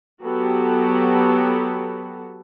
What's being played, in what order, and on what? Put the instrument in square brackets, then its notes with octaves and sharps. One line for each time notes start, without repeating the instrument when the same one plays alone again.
[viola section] F#3 B3 F#4 G4 A4